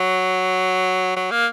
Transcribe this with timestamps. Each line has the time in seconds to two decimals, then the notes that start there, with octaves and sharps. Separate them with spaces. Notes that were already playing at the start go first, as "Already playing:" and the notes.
Already playing: F#3
1.16 F#3
1.31 A#3